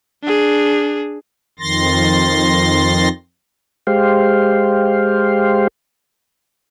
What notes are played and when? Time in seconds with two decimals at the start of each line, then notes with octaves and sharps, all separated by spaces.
0.24 D4 G#4
1.59 F2 D#3 C6 A6 A#6
3.87 G#3 G4 C5 F5